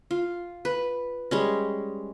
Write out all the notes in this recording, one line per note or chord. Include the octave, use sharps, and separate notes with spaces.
F4
B4
G3 G#3 C#4